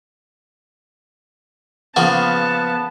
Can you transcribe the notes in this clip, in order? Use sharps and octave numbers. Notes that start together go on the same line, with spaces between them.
C#3 F3 A#3 B3 F#5 A5